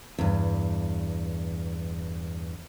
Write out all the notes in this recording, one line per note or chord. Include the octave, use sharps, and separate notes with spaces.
E2 G2